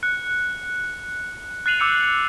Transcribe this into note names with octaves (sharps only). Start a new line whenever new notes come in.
F#6 C#7
F#6 A6 C7 D#7 F7 F#7
D6 E6 G6 C#7 F7